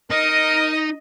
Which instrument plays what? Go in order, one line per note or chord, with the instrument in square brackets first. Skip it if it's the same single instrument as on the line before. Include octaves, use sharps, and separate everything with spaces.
[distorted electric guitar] D#4 [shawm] A#4 [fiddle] D#5